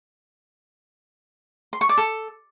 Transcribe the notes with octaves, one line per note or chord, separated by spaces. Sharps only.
C6
C#6
D5
A4